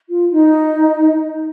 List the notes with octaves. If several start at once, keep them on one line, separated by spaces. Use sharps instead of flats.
F4
D#4